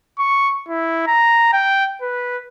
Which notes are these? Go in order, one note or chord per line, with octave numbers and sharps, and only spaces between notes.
C#6
E4
A#5
G5
B4